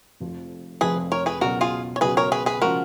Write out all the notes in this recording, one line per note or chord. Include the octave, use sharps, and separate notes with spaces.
F1 F2 F3
F1 F2 F3 G#4 B4
A#4 C#5
G#4 B4
C#2 B2 F#3 F#4 A#4
F4 G#4
C#5
C#2 B2 F#3 G#4 B4
A#4 C#5
G#4 B4
G#4 B4
C#3 F3 G#3 F#4 A#4